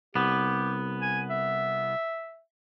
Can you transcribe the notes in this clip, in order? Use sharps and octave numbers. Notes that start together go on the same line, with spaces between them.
C2 B3 G4
G#5
E5